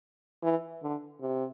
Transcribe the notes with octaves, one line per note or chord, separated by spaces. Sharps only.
E3
D3
C3